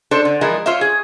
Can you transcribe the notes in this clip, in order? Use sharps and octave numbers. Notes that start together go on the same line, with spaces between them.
D4 A4 C5
D3
E3 F3 G#3 E4 A#4
F4 C5 C#5 E5
G#4